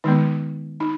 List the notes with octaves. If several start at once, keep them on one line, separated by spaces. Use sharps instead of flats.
D#3 G#3 B3 D#4
D#4